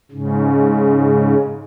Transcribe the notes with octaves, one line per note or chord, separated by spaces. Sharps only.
G#2 C#3